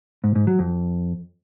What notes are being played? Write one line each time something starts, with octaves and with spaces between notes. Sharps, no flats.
G#2
G#2
F#3
F2